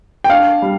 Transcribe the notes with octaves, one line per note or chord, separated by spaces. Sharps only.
G5
D4 F5
G3